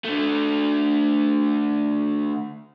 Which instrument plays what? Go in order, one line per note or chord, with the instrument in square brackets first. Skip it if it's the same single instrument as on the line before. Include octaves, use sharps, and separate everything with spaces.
[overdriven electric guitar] D3 A3